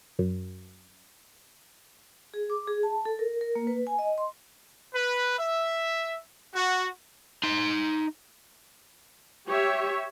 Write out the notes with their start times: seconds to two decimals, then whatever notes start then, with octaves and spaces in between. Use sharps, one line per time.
0.19 F#2
2.34 G#4
2.50 D6
2.67 G#4
2.83 A5
3.05 A4
3.19 A#4
3.41 A#4
3.55 A#3
3.67 B4
3.87 G#5
3.99 D#5
4.18 C6
4.94 B4
5.38 E5
6.54 F#4
7.43 D#4 C6
9.48 G4 C#5 E5